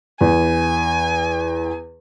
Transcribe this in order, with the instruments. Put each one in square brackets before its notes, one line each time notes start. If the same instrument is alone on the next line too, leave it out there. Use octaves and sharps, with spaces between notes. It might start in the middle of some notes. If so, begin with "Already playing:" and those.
[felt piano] E2 [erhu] G#5